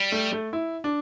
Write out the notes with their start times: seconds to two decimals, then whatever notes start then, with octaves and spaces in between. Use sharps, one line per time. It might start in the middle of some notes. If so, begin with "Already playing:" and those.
Already playing: G3
0.12 A3
0.32 A3
0.53 E4
0.84 D4